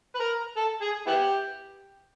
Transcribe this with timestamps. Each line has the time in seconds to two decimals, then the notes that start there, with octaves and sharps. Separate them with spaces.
0.15 B4
0.20 A#4
0.57 A4
0.81 G#4
1.07 B3 E4 G4